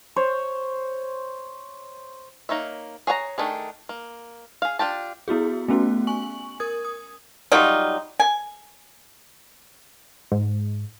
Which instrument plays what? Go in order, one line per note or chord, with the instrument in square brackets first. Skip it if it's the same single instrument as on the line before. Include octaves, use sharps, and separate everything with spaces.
[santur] C5 C#5
[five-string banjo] A#3 D#4 C#5 E5
G#4 C#5 F#5 G5 A#5
D#3 A3 D4 G#4
A#3
G#4 F5
D4 F4 G4 A5
[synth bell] B3 E4 F#4 G#4
A3 B3 C#4 F#4
G#5 C#6 F#7
A#4 D#6 G#6
D#6
[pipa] F#3 G3 D#4 F4
G#5
[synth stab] G#2